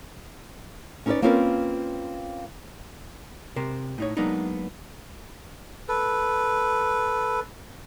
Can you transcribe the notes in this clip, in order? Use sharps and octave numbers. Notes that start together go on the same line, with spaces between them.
C#4 D#4 E4 A4 B4 D5
A#3 C4 C#4 F4 A#4 B4
C3 A#4 C5
A2 D#4 C#5
F#3 G#3 A#3 B3 D4 D#4
A4 B4